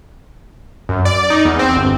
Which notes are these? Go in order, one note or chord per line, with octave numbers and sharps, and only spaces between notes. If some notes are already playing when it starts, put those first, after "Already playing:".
F#2
D5
D#4
E2
C4
G1